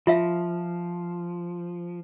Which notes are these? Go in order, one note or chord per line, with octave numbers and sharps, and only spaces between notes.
F3 F4 E5 F5